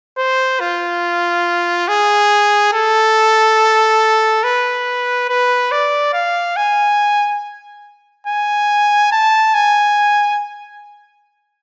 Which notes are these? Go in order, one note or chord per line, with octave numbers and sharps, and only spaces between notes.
C5
F4
G#4
A4
B4
B4
D5
F5
G#5
G#5
A5
G#5